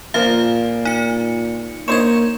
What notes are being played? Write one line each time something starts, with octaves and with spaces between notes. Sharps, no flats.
A#2 F3 A#3 F5
D#4 C#7
A#3 D#4 C5 C#5 G#6 E7